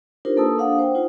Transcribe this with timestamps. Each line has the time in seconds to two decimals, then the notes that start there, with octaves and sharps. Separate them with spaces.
0.25 D4 D#4 F4 G4 A#4 C5
0.37 A#3 A4 B4 A5 D#6 E6
0.58 D4 F5 F#5 D#6
0.79 C5 G5
0.95 D#4 F4 C5